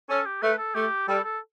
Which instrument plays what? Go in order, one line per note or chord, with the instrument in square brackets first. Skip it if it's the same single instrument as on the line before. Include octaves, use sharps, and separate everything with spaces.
[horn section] C#4 [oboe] A4
[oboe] G4
[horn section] A3 [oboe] B4
[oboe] A4
[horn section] A3 [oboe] G4
[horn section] G3 [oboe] A4
[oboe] A4